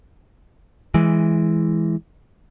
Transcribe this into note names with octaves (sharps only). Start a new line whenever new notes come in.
E3 G#3